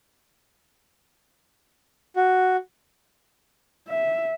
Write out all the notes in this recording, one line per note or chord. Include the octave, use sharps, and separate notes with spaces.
F#4
E5